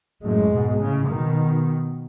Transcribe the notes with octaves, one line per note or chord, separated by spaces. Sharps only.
F#2 A2 G#3
G#2 B2
A2 C#3
B2 D#3